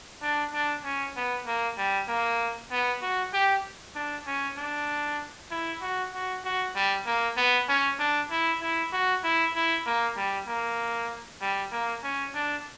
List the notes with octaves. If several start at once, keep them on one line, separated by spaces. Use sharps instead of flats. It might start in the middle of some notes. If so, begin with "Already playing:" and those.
D4
D4
C#4
B3
A#3
G3
A#3
B3
F#4
G4
D4
C#4
D4
E4
F#4
F#4
F#4
G3
A#3
B3
C#4
D4
E4
E4
F#4
E4
E4
A#3
G3
A#3
G3
A#3
C#4
D4